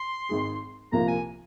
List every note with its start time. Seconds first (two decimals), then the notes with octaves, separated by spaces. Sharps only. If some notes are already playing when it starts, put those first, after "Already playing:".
Already playing: C6
0.29 G#1 G#2 G#3 D#4 G#4
0.92 C2 A#2 F3 A#3 F4 A#5
1.08 G#5